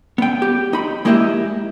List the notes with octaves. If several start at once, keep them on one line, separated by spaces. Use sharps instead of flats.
B3 G5
G4
D#4 B5
G#3 A#3 E4 G4 D#5 E5